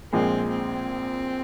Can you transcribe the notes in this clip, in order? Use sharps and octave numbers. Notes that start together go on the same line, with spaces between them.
A#1 A#2 G#3 C4
C4